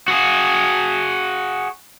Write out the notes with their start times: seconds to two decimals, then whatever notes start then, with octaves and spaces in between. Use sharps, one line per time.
0.08 F#4 G#4